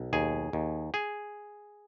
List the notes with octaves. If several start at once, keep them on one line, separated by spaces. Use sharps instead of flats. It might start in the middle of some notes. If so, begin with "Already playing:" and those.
Already playing: B1
D#2 G#4
D#2
G#4